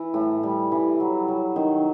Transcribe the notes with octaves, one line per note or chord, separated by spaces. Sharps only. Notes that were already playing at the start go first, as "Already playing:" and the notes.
Already playing: E3
A2
G3
E3
F#3
F#3
D#3